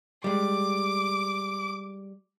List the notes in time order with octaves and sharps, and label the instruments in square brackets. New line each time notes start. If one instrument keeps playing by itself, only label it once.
[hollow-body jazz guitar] G3 G#3 [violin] D6